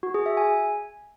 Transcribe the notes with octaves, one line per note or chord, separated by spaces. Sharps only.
F#4
G#4
E5
G#5